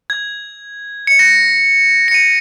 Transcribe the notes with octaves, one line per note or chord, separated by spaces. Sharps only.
G#6
C#7
A#6
C#7
D#7